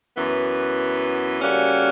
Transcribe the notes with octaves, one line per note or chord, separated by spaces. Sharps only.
F#2 E3 B3
C#3 G3 A#3 C#4 F#4